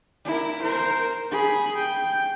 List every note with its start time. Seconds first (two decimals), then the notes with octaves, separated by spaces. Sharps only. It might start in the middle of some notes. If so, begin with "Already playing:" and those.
0.25 E4 A#4
0.63 A#4 C5
1.31 G#4 B5
1.76 G5